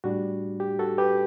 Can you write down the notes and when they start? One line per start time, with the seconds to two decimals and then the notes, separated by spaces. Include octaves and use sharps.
0.04 A2 G3 D4 F#4
0.60 G4
0.79 F#4 A4
0.98 G4 B4